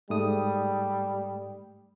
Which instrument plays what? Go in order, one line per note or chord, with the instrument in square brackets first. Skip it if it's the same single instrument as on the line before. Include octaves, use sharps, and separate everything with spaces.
[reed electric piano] G#2 A3 D#6 [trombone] G3